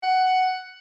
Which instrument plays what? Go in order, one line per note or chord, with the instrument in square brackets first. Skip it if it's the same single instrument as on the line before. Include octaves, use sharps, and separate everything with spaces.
[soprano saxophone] F#5